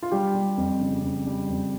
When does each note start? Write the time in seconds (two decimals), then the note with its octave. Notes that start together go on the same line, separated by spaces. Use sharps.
0.02 F4
0.11 G3 G4
0.35 G3
0.57 F2
0.81 C#3
1.03 F2
1.26 G3
1.49 F2